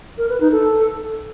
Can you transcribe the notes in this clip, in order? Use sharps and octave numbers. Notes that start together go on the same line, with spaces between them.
A#4
B4
D#4
A4